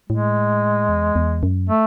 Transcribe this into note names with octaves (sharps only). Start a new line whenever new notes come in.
A2 G#3
E2
E2
F#2
A3